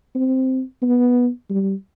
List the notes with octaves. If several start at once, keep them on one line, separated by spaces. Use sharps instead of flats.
C4
B3
G3